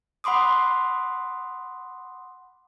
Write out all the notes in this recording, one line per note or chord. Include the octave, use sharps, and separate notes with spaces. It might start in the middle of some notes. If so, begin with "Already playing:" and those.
F#5 B5 C6 D6 D#6